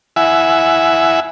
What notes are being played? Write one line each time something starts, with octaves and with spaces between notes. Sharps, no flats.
E4 E5 F#5 G#5